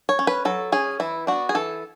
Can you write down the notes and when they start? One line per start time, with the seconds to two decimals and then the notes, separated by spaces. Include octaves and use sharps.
0.09 C#5
0.19 C#4
0.27 B4
0.45 F#3 A4
0.72 C#4 G#4
1.00 E3 E4
1.27 B3 D4 F#4
1.49 G#4
1.55 E3 A4